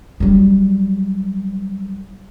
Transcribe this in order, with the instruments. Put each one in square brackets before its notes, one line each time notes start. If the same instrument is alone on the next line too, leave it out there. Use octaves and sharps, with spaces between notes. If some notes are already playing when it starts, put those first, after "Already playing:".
[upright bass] F#3 G3